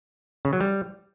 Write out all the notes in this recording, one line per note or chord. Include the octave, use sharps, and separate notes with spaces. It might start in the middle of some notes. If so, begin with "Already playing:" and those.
C#3
F#3
G3